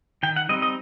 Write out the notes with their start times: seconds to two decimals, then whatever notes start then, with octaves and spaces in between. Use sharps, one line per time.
0.23 D#3 G5
0.36 F#5
0.49 G3 C4 D#4 D#5
0.62 D#5